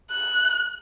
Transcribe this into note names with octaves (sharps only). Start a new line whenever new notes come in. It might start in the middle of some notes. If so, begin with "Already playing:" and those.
F#6